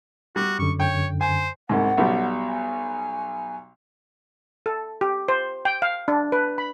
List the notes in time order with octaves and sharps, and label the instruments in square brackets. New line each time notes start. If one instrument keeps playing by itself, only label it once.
[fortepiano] G3 [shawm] F#4
[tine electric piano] F#2 D3 [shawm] C#6
[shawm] C#5 [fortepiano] G5
[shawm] C5 [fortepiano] G#5
[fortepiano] C2 G#2 [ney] F#5
[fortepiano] B1 B2 G3
[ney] G#5
[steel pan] A4
G4
C5
G5
F5
D4
B4
B5